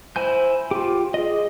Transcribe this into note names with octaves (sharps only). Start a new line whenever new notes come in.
E4 C5 G#5 G6
F4 G4
G#4 D#5